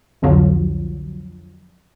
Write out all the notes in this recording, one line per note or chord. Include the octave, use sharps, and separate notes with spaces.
C2 F2 D3 F3 F#3